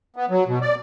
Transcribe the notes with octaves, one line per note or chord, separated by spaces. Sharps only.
B3
F#3
B2
D5